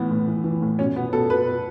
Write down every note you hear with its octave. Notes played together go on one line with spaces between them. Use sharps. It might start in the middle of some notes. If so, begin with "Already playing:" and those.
Already playing: A2 E3 B3
A2
E3
E3
A2
B2 C#4
B2 B3
B2 A4
B2 B4
B2